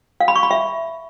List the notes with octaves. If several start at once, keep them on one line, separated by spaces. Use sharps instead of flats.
F5
B5
C#6
B5
E5